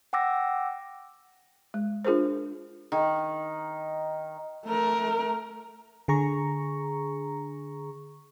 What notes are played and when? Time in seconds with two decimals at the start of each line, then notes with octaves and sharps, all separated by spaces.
0.13 F#5 G5 D6 E6 A#6
1.74 G#3
2.05 D4 F4 G#4 A#4 C5
2.92 D#3
4.66 A3 A#4
6.08 D3 G#4 A#5 C#6